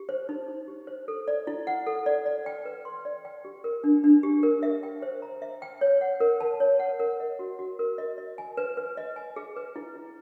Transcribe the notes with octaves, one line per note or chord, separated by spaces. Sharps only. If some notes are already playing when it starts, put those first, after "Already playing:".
Already playing: G4
C5
D#4
D#4
G4
C5
A4
D5
E4
F#5
A4
D5
D5
G5
B4
C6
D5
G5
G4
A#4
D4
D4
G4
A#4
E5
G5
C5
A#5
E5
G5
C#5
F#5
A#4
A5
C#5
F#5
A#4
D#5
F#4
F#4
A#4
D#5
D#5
G#5
B4
B4
D#5
G#5
G#4
B4
E4
E4